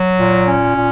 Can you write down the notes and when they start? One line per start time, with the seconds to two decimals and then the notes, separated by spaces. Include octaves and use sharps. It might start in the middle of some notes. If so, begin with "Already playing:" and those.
Already playing: F#3
0.18 A#2
0.47 C#4
0.74 A#2